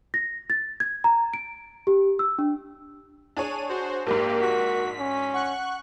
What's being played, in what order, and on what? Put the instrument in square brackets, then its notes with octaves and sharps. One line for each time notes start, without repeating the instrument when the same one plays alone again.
[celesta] A#6
A6
G#6
A#5
D7
G4
E6
D4
[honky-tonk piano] D4 G#4 C#5 [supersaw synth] D#7
[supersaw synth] F#4 C5
[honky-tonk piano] A#1 G#2 [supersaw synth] A#3 G4 [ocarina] A#4
[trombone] F#4 [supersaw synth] B6
[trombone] C#4
[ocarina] F#5 [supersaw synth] C#6 F#6